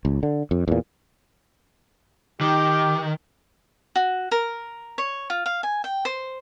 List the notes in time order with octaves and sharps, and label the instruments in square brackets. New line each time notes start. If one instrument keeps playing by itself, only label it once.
[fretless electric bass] C#2
D3
F2
E2 A#2
[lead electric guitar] D#3 [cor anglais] G4
[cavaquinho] F#4
A#4
C#5
F4
F5
G#5
G5
C5